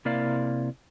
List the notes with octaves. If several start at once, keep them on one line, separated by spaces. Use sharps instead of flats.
C3 A#3 E4 A#4 D5 F5